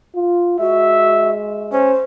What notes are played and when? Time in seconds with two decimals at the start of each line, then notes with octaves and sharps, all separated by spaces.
0.15 F4
0.60 G#3 F#4 E5
1.72 C#4 C5